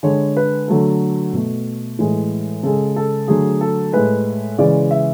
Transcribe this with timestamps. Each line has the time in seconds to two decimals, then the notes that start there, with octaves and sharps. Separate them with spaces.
0.03 D3 G#3 C#5
0.37 B4
0.68 D3 F#3 A3 A4
1.33 B2 A3
1.99 A2 E3 G#3
2.63 C#3 G#3 A4
2.96 A4
3.28 D3 F#3 A3 G#4
3.61 A4
3.93 A2 G#3 B4
4.58 C#3 E3 G#3 D5
4.91 E5